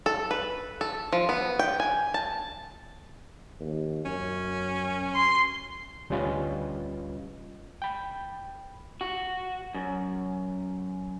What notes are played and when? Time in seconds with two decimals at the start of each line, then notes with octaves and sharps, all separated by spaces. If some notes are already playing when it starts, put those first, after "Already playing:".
0.06 A4
0.31 B4
0.81 A4
1.13 F3
1.29 B3
1.59 G5
1.80 G#5
2.14 A5
3.60 D#2
4.05 F#2 C#4
5.14 C6
6.10 D2 G3 C#4 F4 B4 D#5
7.82 G5 B5
9.01 F#4
9.75 F#2